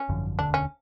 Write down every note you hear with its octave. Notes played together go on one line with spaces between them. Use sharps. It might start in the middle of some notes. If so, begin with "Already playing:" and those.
Already playing: C#4
G#1 F#2 D3 F3
E1 D2 D3 D4
C#4